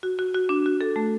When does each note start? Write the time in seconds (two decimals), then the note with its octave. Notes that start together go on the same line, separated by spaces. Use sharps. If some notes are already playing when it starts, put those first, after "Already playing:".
0.03 F#4
0.19 F#4
0.34 F#4
0.49 D4
0.66 F#4
0.81 A4
0.96 A3